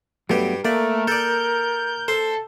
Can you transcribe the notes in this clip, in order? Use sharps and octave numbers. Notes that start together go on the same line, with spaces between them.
G2 F#3 A3 B3 G4
A3 A#3 A#4 D5
A4 D5 G6
A4 C5